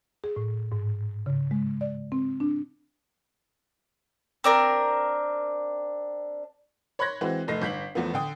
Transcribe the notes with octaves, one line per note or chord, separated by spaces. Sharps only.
G#4
A2
G#2
C#3
G#3
D5
C4
D4
C4 D4 A#4
C#5 B5 C6 F#6 G#6 A#6
E3 G#3 C4 F#4 C5
F1 A3 D#4 A#6 C7
G1 G6 B6 F#7
E2 F3 A3 B3
D3 G5 D#6